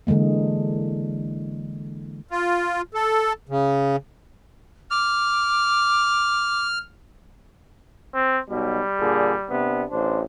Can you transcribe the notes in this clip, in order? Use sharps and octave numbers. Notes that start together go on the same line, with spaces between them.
D3 E3 G#3 A#3
F4
A4
C#3
D6 F6
C4
B1 B2 G3
A#2 D3 G#4
C3 B3 D4
A1 D4 C5